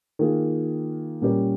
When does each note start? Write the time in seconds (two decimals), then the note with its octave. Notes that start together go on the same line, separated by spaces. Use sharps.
0.19 D#3 A#3 F4 G#4
1.21 A#2 G3 C#4 G4 A#4